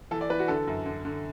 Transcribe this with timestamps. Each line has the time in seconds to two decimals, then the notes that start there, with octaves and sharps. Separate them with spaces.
0.11 E3 A4
0.21 D5
0.30 E3 B4
0.39 F#4
0.48 D3 A4
0.67 F#2
0.86 D3
1.05 D3